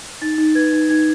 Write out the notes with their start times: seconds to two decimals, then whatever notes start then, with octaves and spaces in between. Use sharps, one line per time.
0.22 D#4 A6
0.38 D#4
0.55 B4 G#6
0.73 D#4
0.90 D#4 G#6